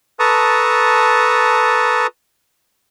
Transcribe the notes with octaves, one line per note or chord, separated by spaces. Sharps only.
A4 B4 A5 A#5 C#6 D#6